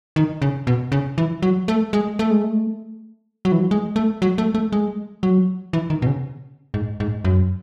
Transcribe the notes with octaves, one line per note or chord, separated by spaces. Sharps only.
D#3
C#3
B2
C#3
E3
F#3
A3
G#3
A3
G#3
A3
F#3
E3
F#3
G#3
A3
F#3
A3
A3
G#3
F#3
E3
D#3
B2
C#3
G#2
G#2
F#2